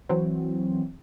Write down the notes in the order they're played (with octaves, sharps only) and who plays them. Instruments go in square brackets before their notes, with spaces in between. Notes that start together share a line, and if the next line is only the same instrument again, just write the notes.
[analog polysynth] E3 F#3 C4